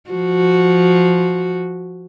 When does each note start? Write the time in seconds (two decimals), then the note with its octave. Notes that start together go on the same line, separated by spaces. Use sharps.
0.10 F3 F#4